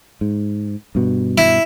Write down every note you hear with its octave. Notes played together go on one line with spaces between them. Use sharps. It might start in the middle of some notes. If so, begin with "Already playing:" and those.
G#2
G2 B2
E4